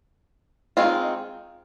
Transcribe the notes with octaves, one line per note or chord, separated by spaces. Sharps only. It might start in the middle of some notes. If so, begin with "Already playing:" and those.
D#3 G#3 C4 F4